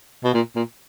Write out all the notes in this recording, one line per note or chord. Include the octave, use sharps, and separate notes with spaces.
B2
A#2
A#2